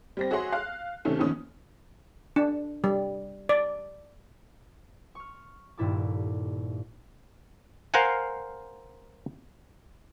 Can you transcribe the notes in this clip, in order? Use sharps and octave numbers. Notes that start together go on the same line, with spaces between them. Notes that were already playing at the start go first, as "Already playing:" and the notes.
G3 C4 A#6
F#4 G#4 C#5 E5 F#5 C6
F5 F#6
C3 D#3 A3 C#4
A#1 E2 D#3 C#4 D#6
D4
G3
D5
C#6 F6
D#1 G2 A#2 E4 A4 D6
A#4 C5 F5 F#5 G#5